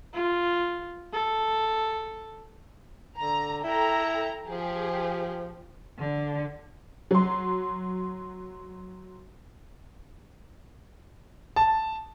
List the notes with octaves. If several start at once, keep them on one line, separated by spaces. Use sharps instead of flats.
F4
A4
D3 A#5
E4 A4 G5 A#5
F3 G4 G#4
D3
F#3 C6
A5